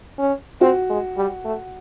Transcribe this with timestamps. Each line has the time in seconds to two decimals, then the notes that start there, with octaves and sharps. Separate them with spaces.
0.18 C#4
0.61 C4 F#4
0.90 G#3
1.17 G3
1.45 A3